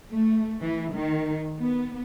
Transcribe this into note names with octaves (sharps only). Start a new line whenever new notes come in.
A3
E3
D#3
B3